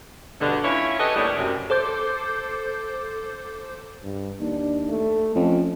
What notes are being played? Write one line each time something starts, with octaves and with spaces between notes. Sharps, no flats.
D2 G2 B2 D3
C#4 E4 F4 C#5
G4 A4 B4 C#5 D#5
D#2 A2 G3 B3 D4 C#5
F#2 C3
A4 C5 D6 G6
G2
D#2 D4
A3
F2 C#4